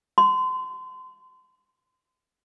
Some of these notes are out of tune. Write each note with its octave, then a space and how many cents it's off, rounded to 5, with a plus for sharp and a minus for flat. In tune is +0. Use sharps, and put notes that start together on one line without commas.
C6 -35